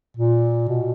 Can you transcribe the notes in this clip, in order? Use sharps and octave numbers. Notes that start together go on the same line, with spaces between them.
A#2
B2